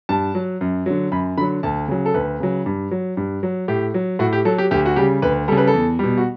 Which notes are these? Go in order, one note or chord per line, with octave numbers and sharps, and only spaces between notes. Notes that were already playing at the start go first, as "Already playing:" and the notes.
G2 A5
F#3
F#2
D3 F#3
F#2 B5
D3 F#3 B5
D2 A5
C#3 F#3
A4
D2 B4
C#3 F#3
G2
F#3
G2
F#3
A2 G4
F#3
A2 F#4
G4
F#3 A4
G4
D2 G4
F#4
C#3 G3 G4
D2 B4
C#3 G3 A4
B4
A4
E2
B2 G3
F#4